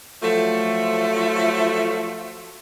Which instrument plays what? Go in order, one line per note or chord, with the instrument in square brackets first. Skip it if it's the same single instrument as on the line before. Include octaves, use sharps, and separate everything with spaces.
[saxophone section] F3 F#3 A3